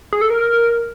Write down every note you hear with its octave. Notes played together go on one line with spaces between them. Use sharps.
G#4
A4
A#4